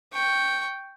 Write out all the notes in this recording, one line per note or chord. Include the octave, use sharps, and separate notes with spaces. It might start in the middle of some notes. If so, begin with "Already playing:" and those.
G5 C#6